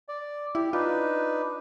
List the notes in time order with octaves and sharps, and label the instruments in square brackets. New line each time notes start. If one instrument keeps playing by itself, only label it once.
[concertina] D5
[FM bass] E4 [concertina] G4
[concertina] D4 D#4 B4 [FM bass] F4